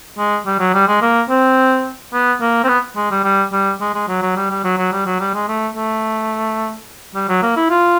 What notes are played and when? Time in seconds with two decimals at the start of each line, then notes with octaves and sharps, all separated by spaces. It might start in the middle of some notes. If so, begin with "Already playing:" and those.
0.18 G#3
0.46 G3
0.60 F#3
0.74 G3
0.88 G#3
1.02 A#3
1.30 C4
2.14 B3
2.41 A#3
2.64 C4
2.69 B3
2.96 G#3
3.11 G3
3.24 G3
3.53 G3
3.81 G#3
3.95 G#3
4.08 F#3
4.22 F#3
4.36 G3
4.51 G3
4.64 F#3
4.78 F#3
4.92 G3
5.06 F#3
5.20 G3
5.34 G#3
5.48 A3
5.75 A3
7.15 G3
7.29 F#3
7.43 A#3
7.56 E4
7.70 F4